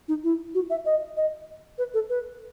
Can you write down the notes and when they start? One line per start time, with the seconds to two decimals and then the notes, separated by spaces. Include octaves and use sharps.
0.08 D#4
0.24 E4
0.54 F#4
0.70 E5
0.85 D#5
1.17 D#5
1.78 B4
1.94 A4
2.09 B4